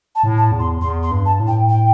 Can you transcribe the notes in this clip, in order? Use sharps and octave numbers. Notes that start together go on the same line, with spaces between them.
A5
A2
A5
E2
C6
E2 C6
C6
G2
A5
A2
G5
G5